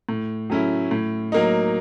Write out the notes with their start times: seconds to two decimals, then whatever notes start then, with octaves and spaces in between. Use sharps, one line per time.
0.09 A2
0.50 F#3 A3 C#4 E4
0.91 A2
1.32 F#3 A#3 D#4